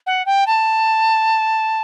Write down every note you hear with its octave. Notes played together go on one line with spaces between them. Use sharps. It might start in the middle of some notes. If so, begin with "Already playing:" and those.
F#5
G5
A5